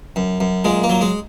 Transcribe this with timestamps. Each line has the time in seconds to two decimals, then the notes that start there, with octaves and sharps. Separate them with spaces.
0.16 F#2
0.40 F#2
0.64 A#2 G#3
0.83 A#3
0.89 F#3
1.01 G#3